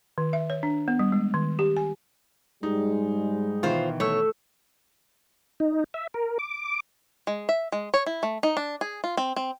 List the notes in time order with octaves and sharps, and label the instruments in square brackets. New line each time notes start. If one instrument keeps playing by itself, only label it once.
[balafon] D#3
E5
C#5
D4
B3
G3
G#3
D#3
G4
G#5
[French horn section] G#2 G3 G#3 [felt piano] D#4
[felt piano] B2 D#3 E3 [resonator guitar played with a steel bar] F4 C5
[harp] A3 E6 [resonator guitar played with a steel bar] C#5
[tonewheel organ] D#4
E5
A#4
D6
[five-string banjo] G#3
E5
G#3
C#5
E4
A3
D#4
D4
G#4
F4
C4
C4